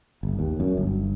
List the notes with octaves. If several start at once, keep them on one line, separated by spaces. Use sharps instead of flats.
G1
D#2
F#2
G1